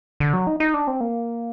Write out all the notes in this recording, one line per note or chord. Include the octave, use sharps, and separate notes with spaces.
D3
F#3
D#4
D#4
D4
C4
A#3